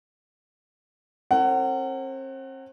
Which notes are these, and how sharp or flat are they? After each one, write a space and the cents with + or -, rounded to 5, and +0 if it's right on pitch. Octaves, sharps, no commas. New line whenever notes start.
C4 +40 A#4 -40 F#5 +20